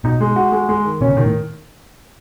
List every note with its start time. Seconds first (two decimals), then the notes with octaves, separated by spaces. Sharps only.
0.04 B2 D#4
0.20 G#3
0.36 F#4
0.52 G#3
0.69 G#3
0.85 D#3
1.01 B2 C#4
1.08 C#3
1.17 B2 D#3
1.25 A2